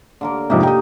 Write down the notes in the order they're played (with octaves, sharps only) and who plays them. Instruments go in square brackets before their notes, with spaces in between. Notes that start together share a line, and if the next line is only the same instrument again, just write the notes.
[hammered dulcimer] D3 A#3 A#4
[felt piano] F2 G#2 C3 [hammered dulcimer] A#3 D#4 G4
[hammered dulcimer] D#4 [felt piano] G5 D#6